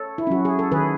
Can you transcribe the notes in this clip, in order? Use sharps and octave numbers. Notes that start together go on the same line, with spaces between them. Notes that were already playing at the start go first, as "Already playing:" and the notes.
Already playing: A4 C#5
E4
F#3 C#4 F#4
G#4
A4
D#3 G#4 B4